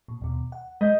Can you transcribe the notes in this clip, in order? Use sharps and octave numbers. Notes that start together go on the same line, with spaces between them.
A#2
D#2 B2
F#5
G#3 D#5 G6